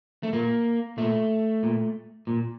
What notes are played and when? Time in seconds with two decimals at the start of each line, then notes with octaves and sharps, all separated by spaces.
0.23 A3
0.33 A#2 A#3
0.98 A#2 A3
1.63 A#2
2.27 A#2